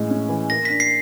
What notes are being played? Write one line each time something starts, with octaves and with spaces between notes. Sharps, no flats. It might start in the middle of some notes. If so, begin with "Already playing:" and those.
Already playing: A2 E3 G#3 C#4
C#4
E3
A#3 A#6
B6
D4
C7